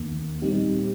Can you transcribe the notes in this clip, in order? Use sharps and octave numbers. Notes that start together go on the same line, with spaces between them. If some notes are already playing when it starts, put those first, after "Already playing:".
Already playing: D#2 D#3 A#3
A#2 G3 C4 D#4 G4